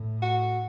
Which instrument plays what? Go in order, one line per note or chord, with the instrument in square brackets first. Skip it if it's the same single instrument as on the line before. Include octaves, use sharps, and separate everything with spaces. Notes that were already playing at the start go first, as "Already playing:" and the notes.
Already playing: [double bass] A2
[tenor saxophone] F#4